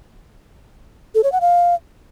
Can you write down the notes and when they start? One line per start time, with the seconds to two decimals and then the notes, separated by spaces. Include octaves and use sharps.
1.15 A4
1.24 C#5
1.32 F#5
1.41 F5